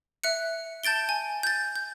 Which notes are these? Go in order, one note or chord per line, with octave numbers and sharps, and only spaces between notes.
E5 F#6 C#7
A5 G6 A6 D7 G7
G#5
G6 A6
G6